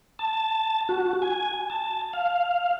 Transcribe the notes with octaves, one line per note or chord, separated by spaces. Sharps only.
A5
F#4
G#5
A5
F5